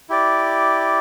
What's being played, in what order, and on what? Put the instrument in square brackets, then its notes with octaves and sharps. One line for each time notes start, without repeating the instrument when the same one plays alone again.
[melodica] E4 G4 D5